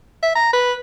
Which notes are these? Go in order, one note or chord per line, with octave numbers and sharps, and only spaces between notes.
E5
A#5
B4